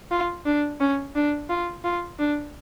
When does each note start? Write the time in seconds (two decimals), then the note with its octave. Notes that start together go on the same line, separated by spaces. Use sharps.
0.11 F4
0.46 D4
0.80 C#4
1.15 D4
1.49 F4
1.84 F4
2.19 D4